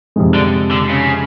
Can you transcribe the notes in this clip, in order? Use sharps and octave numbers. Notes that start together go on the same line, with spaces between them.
F2 C3 F3 G#3
D3
D3
C#3